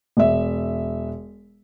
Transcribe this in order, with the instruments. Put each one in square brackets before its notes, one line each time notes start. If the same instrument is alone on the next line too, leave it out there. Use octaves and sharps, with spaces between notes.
[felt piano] E1 E5